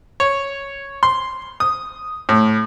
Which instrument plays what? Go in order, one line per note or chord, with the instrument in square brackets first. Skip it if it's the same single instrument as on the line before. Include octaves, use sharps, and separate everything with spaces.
[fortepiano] C#5
C6
D#6
A2